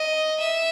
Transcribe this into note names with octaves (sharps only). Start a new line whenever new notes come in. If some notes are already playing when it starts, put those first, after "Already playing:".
Already playing: D#5
E5